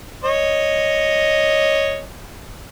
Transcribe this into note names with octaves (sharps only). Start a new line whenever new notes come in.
C#5 D#5